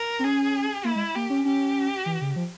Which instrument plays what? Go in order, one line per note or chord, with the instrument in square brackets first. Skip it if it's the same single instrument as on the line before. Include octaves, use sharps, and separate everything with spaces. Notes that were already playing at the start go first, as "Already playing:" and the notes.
Already playing: [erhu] A#4
[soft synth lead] C4
[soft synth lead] C#4 [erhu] G#4
[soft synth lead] A#3 [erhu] E4
[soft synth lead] G#3
[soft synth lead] A#3 [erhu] G4
[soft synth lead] C#4
[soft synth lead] C#4 [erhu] G4
[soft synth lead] E3
C#3
F3